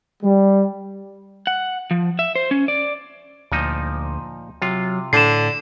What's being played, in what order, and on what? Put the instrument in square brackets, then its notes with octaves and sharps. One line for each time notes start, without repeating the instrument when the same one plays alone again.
[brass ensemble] G3
[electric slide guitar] F#5
F3
E5
C5
C#4
D5
[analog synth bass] D2 [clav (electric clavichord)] A#2 F3 D#4
[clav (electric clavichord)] C3 F4 [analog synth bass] F#3
[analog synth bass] A2 [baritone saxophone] D3 [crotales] C7 E7